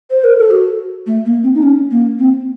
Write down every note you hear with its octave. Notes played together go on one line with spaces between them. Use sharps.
C5
A#4
A4
F#4
A3
A#3
C4
D#4
C#4
A#3
C4